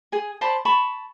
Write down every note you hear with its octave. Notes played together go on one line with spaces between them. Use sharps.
G#4 G#5
C5 D5 A5 B5
A5 B5 C#6